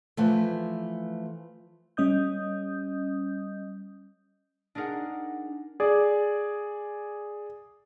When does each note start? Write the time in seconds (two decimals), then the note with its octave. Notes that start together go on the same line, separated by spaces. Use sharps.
0.17 E3 F3 A3
1.97 G3 C#4 D#5 D#6 G6
4.75 D4 D#4 G#4 A#4 F#5
5.80 G#4 D5